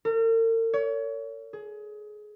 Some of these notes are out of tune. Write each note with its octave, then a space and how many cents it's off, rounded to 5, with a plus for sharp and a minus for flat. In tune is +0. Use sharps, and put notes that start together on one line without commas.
A#4 -45
C#5 +30
G#4 +20